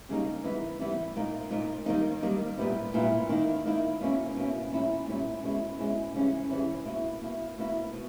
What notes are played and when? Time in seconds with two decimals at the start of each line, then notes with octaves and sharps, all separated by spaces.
0.09 C#3 G3 A#3 D#4
0.44 E3 G3 B3 E4
0.79 E3 G3 B3 E4
1.16 A#2 A#3 D#4
1.50 A#2 A#3 D#4
1.86 D#3 G3 A#3 D#4
2.22 D#3 G3 A#3 D#4
2.58 A#2 G3 B3 E4
2.94 A#2 G3 B3 E4
3.29 D#3 A#3 E4
3.65 D#3 A#3 E4
4.01 B2 A#3 C#4 E4
4.36 B2 A#3 C#4 E4
4.72 A#2 G3 C#4 E4
5.07 A#2 G3 C#4 E4
5.44 B2 G#3 C#4 E4
5.79 B2 G#3 C#4 E4
6.14 C#3 E3 G3 C#4 E4
6.50 C#3 E3 G3 C#4 E4
6.85 B2 A#3 E4
7.21 B2 A#3 E4
7.57 B2 A#3 E4
7.93 B2